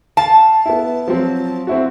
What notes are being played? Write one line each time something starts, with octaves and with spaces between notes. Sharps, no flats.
F5 A5
B3 E4
F3 F#3 C4
C4 E4 F#4